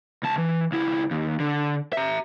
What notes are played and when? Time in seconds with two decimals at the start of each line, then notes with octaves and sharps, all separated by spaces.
0.23 C#2 A5
0.38 E3
0.72 C#2 E4
1.11 D#2
1.40 D3
1.93 E5 A#5